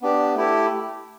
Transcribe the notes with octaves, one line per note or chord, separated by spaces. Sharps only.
B3 D4 G4
A3 E4 G4